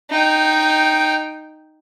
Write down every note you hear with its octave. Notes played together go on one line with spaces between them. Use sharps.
D#4 G5